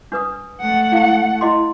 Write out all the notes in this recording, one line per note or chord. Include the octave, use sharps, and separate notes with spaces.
D4 B4 D#6
A3 F#5
E4 F5
E4 D#5 C6